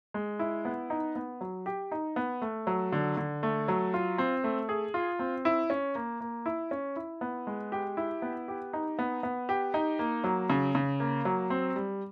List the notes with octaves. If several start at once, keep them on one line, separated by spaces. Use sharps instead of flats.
G#3
E4
B3
D#4
B3
F#3
G4
D#4
B3
A3
F#3
D3
D3
A3
F#3
F4
C4
A3
G#4
F4
C4
E4
C#4
A#3
A#3
E4
C#4
E4
B3
G#3
G4
E4
B3
G4
D#4
B3
B3
G4
D#4
A#3
F#3
C#3
C#3
A#3
F#3
C4
G3